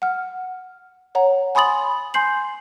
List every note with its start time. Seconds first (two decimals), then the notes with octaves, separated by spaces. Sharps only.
0.02 F#5 F6
1.15 C#5 F#5 A#5
1.55 G#5 B5 C6 D#6 A6 F#7
2.14 G#5 C6 G6 C7 F#7